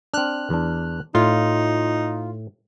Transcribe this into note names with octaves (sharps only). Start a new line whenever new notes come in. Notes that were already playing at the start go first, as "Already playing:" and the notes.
C4 D4 F6 F#6
E2 D4
A2 D#4 F4